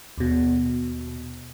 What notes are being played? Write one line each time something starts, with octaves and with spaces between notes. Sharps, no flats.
D#2 B2